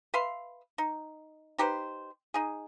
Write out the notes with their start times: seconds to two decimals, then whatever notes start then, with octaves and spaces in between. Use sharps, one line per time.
0.14 B4 E5 F5 C6
0.78 D#4
1.58 D#4 G4 B4 C5
2.34 D#4 G#4